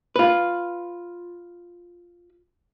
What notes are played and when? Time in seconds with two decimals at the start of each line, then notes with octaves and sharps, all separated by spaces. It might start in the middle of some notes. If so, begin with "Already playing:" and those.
0.16 F4 B4